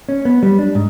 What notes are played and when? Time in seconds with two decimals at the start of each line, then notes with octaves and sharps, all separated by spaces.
0.09 C#4
0.25 B3
0.43 G3
0.59 D4
0.75 G#2